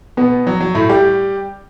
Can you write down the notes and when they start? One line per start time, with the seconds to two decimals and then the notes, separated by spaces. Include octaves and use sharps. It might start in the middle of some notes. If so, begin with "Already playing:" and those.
0.17 B2 B3
0.47 F#3
0.61 F#3
0.75 A2 A3
0.89 G3 G4